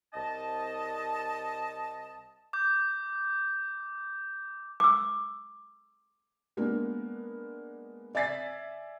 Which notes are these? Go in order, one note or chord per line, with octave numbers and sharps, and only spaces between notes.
C2 D#5 A5
D6 G6
D6 E6
G#3 A#3 B3 D4 A#4
D5 E5 G#5 A6 B6 C7